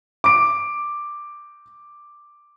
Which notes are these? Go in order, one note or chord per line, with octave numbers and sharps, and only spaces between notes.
D6 D7